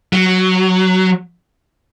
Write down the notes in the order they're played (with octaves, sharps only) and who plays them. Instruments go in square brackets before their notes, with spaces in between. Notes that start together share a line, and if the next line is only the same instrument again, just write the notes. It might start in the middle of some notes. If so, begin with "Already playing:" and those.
[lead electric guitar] F#3